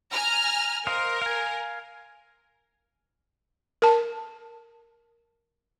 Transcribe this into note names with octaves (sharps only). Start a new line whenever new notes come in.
G#5 A#5 F6
A#4 C5 D#5 F5
F5 G#5
A#4 A5